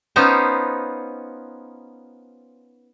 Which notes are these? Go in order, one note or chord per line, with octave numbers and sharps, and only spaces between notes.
B3 C#4 D#4 F4 C5